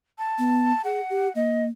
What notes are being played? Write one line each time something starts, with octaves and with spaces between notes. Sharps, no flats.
A5
B3
G#4 F#5
G4
A#3 D#5